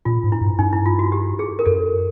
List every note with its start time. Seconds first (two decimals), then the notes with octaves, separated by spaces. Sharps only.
0.05 A#2 F4
0.24 G#2
0.32 E4
0.41 G2
0.59 G2 D#4
0.73 E4
0.86 F4
0.99 F#4
1.12 G4
1.39 G#4
1.59 A#4
1.66 F#2 A4